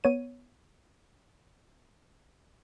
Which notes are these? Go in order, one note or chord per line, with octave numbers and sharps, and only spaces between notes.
B3 C#5 D#7